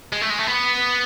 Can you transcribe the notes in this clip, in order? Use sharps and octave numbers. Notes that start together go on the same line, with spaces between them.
G#3
A3
G#3
A3
B3